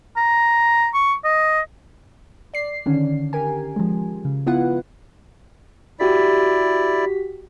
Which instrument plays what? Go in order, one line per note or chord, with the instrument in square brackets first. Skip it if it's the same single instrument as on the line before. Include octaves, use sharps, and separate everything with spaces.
[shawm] A#5
C#6
D#5
[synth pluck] D5 C7
D3 D#3 C#4
G4 A#4 G#5
F3 G#3
C#3
B3 E4 F4 B4 F#5
[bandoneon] E4 D5 [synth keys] F#4 G4 B6